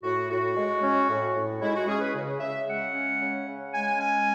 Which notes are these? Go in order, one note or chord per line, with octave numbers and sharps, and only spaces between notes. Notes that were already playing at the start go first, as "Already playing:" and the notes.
A2 F#4
A2 F#4
G#3
C#4
A2
A2
G#3 E4
F#4
C#4 G#4
B4
C#3
C#3 E5
G#3 F#5
C#4
C#3
C#3
G#3 G#5
C#4 G#5